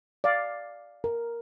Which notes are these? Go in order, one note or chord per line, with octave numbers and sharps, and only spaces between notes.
D5 F5
A#4